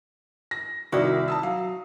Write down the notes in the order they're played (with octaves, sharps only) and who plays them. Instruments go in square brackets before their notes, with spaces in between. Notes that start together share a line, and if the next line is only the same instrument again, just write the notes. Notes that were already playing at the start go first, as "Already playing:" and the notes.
[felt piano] A#6
[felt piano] C2 D#3 [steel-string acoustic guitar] E4 D5 [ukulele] F#4 A#4
[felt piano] A5 D#6 E6
[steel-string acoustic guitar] F#3 [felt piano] F5